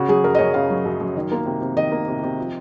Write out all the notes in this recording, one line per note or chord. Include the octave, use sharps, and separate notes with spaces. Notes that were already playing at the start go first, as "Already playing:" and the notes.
Already playing: C#3 F#4
F#3 G#4
F#2 A#4
D#5
F#2 C#5
C#3 F5
F#3
F#2
F#2
D#3
A#3
C3
C3
D#3 D#5
A#3
C3
C3
F3